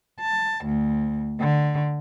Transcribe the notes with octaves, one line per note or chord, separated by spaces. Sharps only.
A5
D2
D3